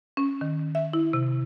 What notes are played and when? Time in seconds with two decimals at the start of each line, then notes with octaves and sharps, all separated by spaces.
0.17 C#4
0.41 D#3
0.75 E5
0.93 E4
1.13 C3